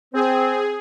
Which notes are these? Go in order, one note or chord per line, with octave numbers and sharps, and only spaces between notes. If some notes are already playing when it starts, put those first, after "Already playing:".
C4 G#4 C5